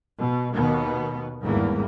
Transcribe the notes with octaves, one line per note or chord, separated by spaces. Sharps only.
B2
D#2 B2 D#3 B3
G#1 E2 G2 E3 A#3